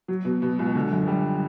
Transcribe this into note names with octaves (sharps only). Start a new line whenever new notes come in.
F#3
B2
B2
C#2
D3
F#2
G3